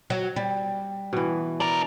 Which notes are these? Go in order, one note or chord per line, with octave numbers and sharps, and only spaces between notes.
F#3
G3
B2 E3
D4 A#4 D5